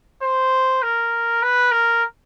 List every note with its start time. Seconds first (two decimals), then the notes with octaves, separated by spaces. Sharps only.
0.23 C5
0.82 A#4
1.43 B4
1.72 A#4